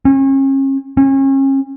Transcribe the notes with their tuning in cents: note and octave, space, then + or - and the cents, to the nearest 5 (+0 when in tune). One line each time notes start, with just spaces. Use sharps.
C#4 -35
C#4 -35